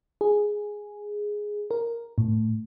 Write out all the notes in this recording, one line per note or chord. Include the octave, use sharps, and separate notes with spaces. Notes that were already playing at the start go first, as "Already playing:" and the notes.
G#4
A#4
A2